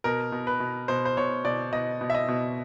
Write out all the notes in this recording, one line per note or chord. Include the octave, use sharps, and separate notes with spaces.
B2 A#4
B2
B4
B2
B2 C5
C5
B2 C#5
B2 D5
B2 D#5
B2
E5
D#5
B2